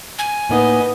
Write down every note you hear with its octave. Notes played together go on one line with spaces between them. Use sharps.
G#5
A2 A#3 B3 D#4 D#5